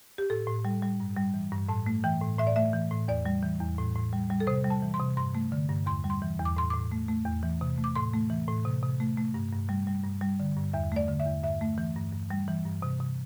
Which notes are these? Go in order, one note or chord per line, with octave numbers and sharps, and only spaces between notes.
G4
A2 A4
A2
G3
G3
G2
G3
E3
G2
A2 A5
A3
E3 G5
A2
A2 E5
D5
A3 E5
E3
A2
E2 D5
G3
E3
E2
A2
A2
G3
G3
A4
C3 C5
G3
A5
E3
C6
C3
G2 C6
A3
D3
G2
E2 C6
G3
C6
E3
E2
D6
A2 C6
A2 D6
A3
A3
E2
E3
C3
A3
D6
A2 C6
A3
E3
A2
C3
C3
A3
A3
G2
G2
G3
G3
G2
G3
D3
G2
E2 E5
A3 D5
D3
E5
E2
G2 E5
A3
E3
G2
G2
G3
E3
G2
C3
C3